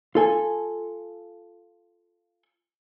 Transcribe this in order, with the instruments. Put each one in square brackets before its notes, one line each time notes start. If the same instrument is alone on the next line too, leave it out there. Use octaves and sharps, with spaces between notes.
[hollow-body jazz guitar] F4 A4 G#5